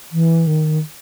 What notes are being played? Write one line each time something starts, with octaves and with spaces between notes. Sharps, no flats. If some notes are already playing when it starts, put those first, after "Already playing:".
E3
D#3